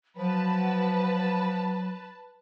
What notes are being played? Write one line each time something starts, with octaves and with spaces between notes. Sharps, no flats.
F3 F#3 B4 A5